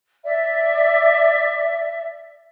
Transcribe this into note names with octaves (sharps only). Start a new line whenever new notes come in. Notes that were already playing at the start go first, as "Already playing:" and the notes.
D5 E5